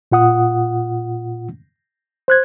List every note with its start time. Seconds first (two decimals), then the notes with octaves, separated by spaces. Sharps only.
0.12 A#2 F4 F#5 D#6
2.28 C5 F#6 G#6